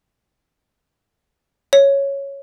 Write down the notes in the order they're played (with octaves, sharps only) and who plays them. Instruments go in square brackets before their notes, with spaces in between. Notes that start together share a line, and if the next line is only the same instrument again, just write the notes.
[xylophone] C#5